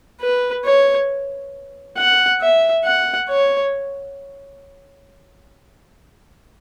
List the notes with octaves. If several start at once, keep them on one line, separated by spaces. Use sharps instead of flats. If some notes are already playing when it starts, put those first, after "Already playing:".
B4
C#5
F#5
E5
F#5
C#5